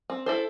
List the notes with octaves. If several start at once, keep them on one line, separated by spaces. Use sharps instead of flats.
C4
E4 A4 C5